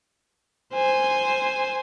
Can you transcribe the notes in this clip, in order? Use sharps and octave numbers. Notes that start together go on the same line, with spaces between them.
C5 G#5